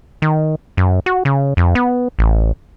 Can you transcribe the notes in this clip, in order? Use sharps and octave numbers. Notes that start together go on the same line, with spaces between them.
D#3
F#2
F#4
C#3
F2
B3
A1